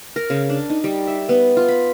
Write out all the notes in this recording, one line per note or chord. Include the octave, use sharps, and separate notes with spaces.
A#4
C#3
D4
D#4
G3
E5
B3
F4
B5